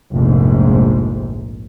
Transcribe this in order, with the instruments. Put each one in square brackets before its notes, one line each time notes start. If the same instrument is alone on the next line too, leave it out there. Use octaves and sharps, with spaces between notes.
[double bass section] F1 A#1 G#2